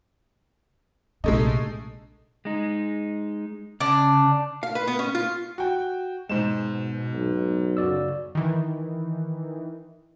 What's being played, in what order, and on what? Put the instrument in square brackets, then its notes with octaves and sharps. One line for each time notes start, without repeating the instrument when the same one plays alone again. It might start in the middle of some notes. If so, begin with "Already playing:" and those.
[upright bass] A#1 C3 [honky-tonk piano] G#3 A3 D#4
[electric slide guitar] G#3 D#4
[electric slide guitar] C#3 [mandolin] D4
[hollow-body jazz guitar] F5
B4
B3
C#4
F4
[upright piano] F#4 G5
[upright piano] G#2 C5 E7 [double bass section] B2 [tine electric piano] G#3
[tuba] B1
[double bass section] F#2 C#3 [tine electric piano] F#4 D5 E6
[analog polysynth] D#3 E3